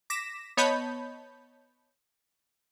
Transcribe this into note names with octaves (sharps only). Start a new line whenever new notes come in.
D6 A#6 B6 E7
B3 C#5 D#5 A5 B5 G6